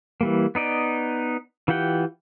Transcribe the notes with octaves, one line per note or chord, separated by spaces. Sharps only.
E3 G3 A#3
B3 D#4 D5 D#5
E3 F4 G4 F#5 G5